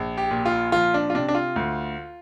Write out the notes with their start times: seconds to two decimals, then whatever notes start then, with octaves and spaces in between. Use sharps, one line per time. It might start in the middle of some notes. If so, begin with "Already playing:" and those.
Already playing: A#1
0.17 G4
0.31 A#2
0.46 F4
0.72 F3 F4
0.94 D4
1.10 F4
1.15 C3 D4
1.29 D4
1.35 F4
1.56 D2